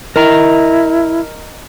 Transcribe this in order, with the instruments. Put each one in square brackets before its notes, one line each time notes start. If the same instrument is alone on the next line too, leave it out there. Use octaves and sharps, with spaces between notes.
[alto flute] E4 [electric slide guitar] A#4 D#5 A#5